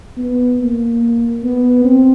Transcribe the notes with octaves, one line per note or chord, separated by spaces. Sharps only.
B3
A#3
B3
C4